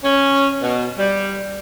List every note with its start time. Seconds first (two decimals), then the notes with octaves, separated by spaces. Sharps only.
0.04 C#4
0.62 B2
0.98 G3